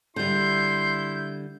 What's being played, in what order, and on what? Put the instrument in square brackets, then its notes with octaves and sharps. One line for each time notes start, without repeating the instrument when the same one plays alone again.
[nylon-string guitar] D3 G3 [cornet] E4 [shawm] C6 [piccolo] G6